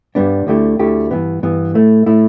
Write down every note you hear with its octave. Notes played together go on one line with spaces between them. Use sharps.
G2 G3 B3 D4
D2 D3 A3 E4 G4
D2 D3 A3 E4 G4
G2 E3 B3
G2 E3 B3
A2 A3 E4
A2 A3 E4